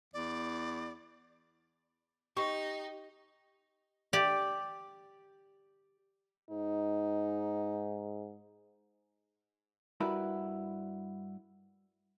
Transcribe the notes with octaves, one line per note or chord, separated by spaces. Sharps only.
E2 D5
D#4 G4 C5 D#5 C#6
G4 D5
G#2 D#4
G2 E4 F#4 A#4 B4